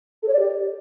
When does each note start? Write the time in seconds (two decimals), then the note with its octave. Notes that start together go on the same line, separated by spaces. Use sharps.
0.23 A4
0.28 C#5
0.34 D5
0.39 G4